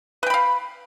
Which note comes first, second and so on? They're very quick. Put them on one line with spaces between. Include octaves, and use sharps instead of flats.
B4 G5 B5 F5